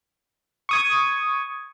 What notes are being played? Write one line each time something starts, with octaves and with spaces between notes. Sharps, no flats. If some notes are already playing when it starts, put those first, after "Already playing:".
C#6 D#6 G#6